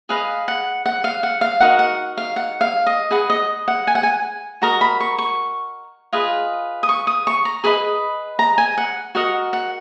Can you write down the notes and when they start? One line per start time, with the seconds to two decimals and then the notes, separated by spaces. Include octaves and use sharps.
0.09 G#4 B4 D#5 F5
0.48 F#5
0.86 F#5
1.04 F5
1.23 F#5
1.41 F5
1.60 D#4 F#4 A#4 F#5
1.79 F#5
2.17 F5
2.36 F#5
2.61 F5
2.86 D#5
3.11 G#4 B4 D#5 F#5
3.30 D#5
3.68 F#5
3.87 G#5
3.95 F#5
4.03 G#5
4.62 F#4 A#4 D#5 A#5
4.81 B5
5.00 C#6
5.18 C#6
6.13 F4 G#4 B4 D#5
6.83 D#6
6.89 C#6
7.07 D#6
7.27 C#6
7.45 A#5
7.64 G#4 B4 D#5 B5
8.39 A#5
8.58 G#5
8.78 F#5
9.15 F#4 A#4 D#5 F#5
9.53 F#5